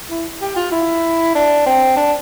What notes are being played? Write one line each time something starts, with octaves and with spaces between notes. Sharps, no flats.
E4
G4
F4
E4
D4
C4
D4